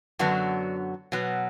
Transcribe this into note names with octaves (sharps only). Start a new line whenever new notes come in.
F#2 D3 F#3 B3 D4 F#4
B2 F#3 B3